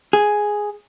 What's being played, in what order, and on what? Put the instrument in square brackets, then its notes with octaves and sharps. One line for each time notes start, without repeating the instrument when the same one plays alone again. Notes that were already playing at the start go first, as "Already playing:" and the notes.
[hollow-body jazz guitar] G#4